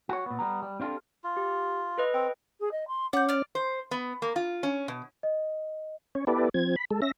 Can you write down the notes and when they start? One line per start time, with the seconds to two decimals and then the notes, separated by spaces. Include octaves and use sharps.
0.09 F#4 C#5
0.26 A#2 B3
0.39 G3 B3 A#5
0.62 G3
0.80 C4 D4 F4 G4 A4
1.24 F4
1.37 G4
1.98 A4 B4 D#5
2.14 C4 G5
2.60 G#4
2.72 D#5
2.88 C6
3.13 C#4 F#5 D6 G6
3.29 D5 F6
3.55 C5
3.91 B3
4.22 A#3
4.36 F4
4.63 C#4
4.88 B2
5.23 D#5
6.15 C#4 C#5
6.27 B3 E4 G4 A4 B4 D5
6.54 F3 C4 G#6
6.76 B5
6.91 G#3 A4
7.02 C#4 E5 A#6